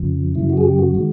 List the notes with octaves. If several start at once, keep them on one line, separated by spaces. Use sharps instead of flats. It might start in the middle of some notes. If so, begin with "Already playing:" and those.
Already playing: F2 C#3 F3
F#2 C#3 F#3 E4
F#4
G#4
G4
F#4
D#3 G#3